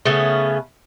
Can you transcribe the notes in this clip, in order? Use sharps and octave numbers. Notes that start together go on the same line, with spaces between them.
C#3 A3 B3 C#4